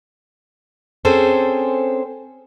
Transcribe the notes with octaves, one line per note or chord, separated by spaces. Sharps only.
C4 C#4 G#4 A4 C5